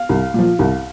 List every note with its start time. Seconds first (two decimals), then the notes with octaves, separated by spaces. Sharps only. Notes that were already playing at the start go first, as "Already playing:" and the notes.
Already playing: F5
0.09 C2
0.34 A#2 F3
0.59 C2